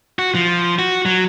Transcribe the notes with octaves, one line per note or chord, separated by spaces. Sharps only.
F#4
F3
F#4
F#3